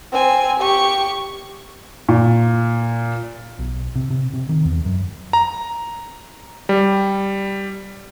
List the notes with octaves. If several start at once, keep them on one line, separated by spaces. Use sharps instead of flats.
C4 G#5
G4 C#6
A#2
B1
C3
C3
C3
D#3
E2
F#2
A#5
G3